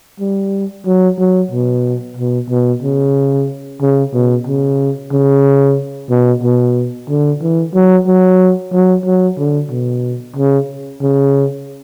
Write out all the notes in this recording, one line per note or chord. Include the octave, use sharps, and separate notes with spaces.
G3
F#3
F#3
B2
B2
B2
C#3
C#3
B2
C#3
C#3
B2
B2
D3
E3
F#3
F#3
F#3
F#3
D3
B2
C#3
C#3